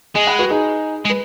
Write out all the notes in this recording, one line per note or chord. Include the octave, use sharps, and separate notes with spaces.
G#3 D#5 G#5
F#5 B5
F#4 B4
D#4 G#4
G#3
B4